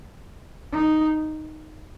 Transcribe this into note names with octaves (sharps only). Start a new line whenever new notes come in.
D#4